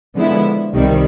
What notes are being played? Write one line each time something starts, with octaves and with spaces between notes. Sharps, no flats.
D3 F3 G#3 B3 E4
C2 C3 D#3 G3